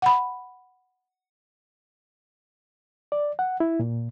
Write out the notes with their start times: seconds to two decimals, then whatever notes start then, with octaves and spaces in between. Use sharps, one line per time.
0.02 F#5 B5
3.12 D5
3.39 F#5
3.60 E4
3.80 A#2